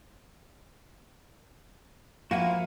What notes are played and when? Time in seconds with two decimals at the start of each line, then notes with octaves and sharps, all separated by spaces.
2.31 F3 A#3 E4 F#4 F5 F#5 G#5